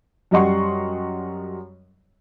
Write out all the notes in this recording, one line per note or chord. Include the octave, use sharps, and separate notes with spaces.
F#2 G3 D#5 F#5 C6 C#6